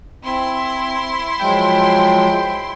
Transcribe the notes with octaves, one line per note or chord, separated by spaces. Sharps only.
C4 E4 C6
F3 F#3 G#3 G5